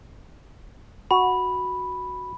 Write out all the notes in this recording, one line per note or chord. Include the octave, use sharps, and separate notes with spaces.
F#4 B5